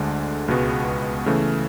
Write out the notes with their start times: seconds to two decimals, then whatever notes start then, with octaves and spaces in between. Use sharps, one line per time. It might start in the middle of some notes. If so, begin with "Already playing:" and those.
Already playing: D2 D3 G#3 D4
0.48 C#2 B2 G#3 B3 F#4
1.26 C#3 E3 A3